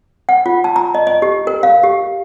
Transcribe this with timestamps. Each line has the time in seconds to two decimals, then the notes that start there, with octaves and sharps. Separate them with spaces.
0.29 F#5
0.46 F4
0.64 A5
0.76 A#5
0.95 D#5
1.07 D#5
1.22 G4
1.47 A#4
1.63 F5
1.83 G4